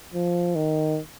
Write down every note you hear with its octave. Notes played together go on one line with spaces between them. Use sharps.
F3
D#3